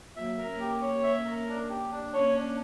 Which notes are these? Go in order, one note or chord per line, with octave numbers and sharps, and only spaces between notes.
F#3 A#3 E5
A#4
A#3 C#4
G4
C#5
E5
A#4
D4
G4
D4
A#3 C#4 C#5
D4